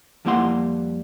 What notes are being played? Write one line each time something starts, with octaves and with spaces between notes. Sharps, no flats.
F2 G3 A#3 E4 F#5 C6